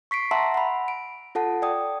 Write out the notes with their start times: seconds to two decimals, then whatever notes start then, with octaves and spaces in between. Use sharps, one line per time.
0.11 C#6 B6 C7 D7
0.31 E5 F#5 A5 A#5 C6 E6
0.54 F#5 B5
0.88 D7
1.35 F4 A4 F#5 A5
1.62 D5 G5 D#6